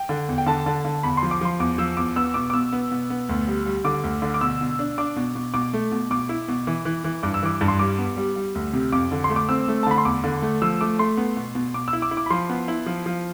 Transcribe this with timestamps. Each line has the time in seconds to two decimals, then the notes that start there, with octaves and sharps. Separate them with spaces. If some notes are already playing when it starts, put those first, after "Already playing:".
Already playing: G5
0.09 D3
0.28 E2
0.38 G5
0.47 D3 A5
0.66 D3
0.85 D3
1.03 E2 B5
1.17 C6
1.23 F3
1.31 D6
1.41 F3 C6
1.60 E2 D6
1.78 F3 E6
1.97 E2 D6
2.16 B3 E6
2.34 B2 D6
2.50 D6
2.53 B2 E6
2.73 B3
2.91 B2
3.10 B3
3.29 D2
3.48 G3
3.66 G3
3.84 D3 D6
4.04 D2
4.22 D3
4.34 D6
4.41 B2 E6
4.61 B2
4.79 D4
4.98 D4 D6
5.16 B2
5.35 B2
5.54 B2 D6
5.73 A3
5.92 B2
6.11 B2 D6
6.29 E4
6.48 B2
6.67 E3
6.85 E3
7.04 E3
7.23 G2 D6
7.34 E6
7.43 E3 D6
7.61 G2
7.68 C6
7.79 G3 D6
7.98 B3
8.17 G3
8.36 G3
8.55 D2
8.73 C3
8.92 F2 D6
9.12 D3
9.24 C6
9.30 A3
9.36 D6
9.49 C4 E6
9.68 A3
9.83 A5
9.87 D3 B5
9.98 C6
10.05 E2 D6
10.24 D3
10.42 A3
10.62 F3 E6
10.81 A3 D6
10.99 A3 C6
11.17 B3
11.36 B2
11.55 B2
11.74 B2 D6
11.88 E6
11.93 E4
12.02 D6
12.11 E4
12.17 D6
12.26 B5
12.30 F3 C6
12.49 B3
12.68 E4
12.86 F3
13.06 F3